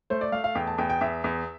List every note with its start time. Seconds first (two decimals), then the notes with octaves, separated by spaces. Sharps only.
0.10 A3 C5
0.21 D5
0.32 A3 F5
0.44 F5
0.55 E2 G5
0.67 A5
0.78 E2 G5
0.90 G5
1.01 E2 E5
1.24 E2